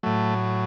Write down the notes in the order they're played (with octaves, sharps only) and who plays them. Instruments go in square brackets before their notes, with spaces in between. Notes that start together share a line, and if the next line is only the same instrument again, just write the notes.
[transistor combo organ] A2 F#3 A3